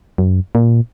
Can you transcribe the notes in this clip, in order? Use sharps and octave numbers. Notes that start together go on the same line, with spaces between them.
F#2
A#2